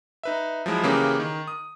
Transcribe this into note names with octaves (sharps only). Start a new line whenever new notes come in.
D#4 B4 E5
F3 F#3 G#3 E4
C#3 E3 A#3 C#4 G4 G#4
D#3
D#6